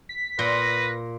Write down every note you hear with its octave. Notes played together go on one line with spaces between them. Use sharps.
B6
A#2 B4 A#6